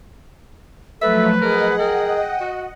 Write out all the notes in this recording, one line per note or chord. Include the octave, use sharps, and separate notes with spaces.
F3 F#3 A3 A4 B4 E5
G#4 A#4 D#5 F#5
A#4 G5
F#4